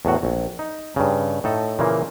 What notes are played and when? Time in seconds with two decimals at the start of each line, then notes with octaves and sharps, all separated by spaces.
0.05 E2 A2 F#4
0.23 A#1
0.59 D#4
0.96 G2 C#3
1.44 A2 D#4 A4
1.79 A#2 C#3 E3 A#3